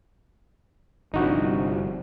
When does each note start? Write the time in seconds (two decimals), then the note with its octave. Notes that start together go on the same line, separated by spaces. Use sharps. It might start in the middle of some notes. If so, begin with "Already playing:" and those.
1.14 G1 C2 F3 D4 D#4 F#4